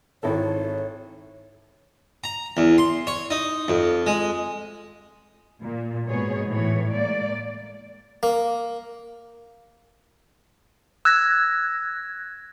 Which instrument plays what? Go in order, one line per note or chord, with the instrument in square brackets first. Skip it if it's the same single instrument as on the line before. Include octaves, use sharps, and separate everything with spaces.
[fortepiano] G#1 E4 A4 [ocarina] C#5
[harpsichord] A#5
E2
C6
C#5
D#4
F2
G#3
[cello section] A#2
G#2 B2 B3 G#4 C#5
A2 E3 C#5
G#3 A#3 D5
[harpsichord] A#3
[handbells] E6 [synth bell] F#6 G#6 A#6